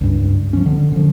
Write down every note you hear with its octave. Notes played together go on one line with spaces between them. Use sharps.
C#2 G2
F3 A3 C#4
D3
D3 F3